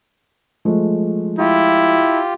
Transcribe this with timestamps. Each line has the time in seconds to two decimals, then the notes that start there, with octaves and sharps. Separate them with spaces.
0.65 F3 G#3 A3
1.39 E4 F4 G4